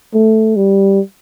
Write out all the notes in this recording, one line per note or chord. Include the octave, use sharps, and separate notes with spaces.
A3
G3